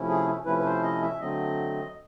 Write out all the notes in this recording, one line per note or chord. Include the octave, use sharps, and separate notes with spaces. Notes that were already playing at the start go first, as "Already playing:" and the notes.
Already playing: C3 F3 A3 C#4 E4
G#4
C3 F3 A3 C#4 E4 B4
B4
C5
D#5
E5
D3 F#3 A3 C4 D#5